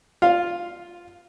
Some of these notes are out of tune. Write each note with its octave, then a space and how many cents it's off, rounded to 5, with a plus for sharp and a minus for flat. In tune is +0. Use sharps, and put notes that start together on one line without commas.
F4 +0 F5 +0